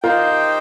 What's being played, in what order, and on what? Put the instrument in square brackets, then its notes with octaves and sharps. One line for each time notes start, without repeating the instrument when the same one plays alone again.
[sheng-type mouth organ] D#4 G4 C5 G5 [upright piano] F4 A#4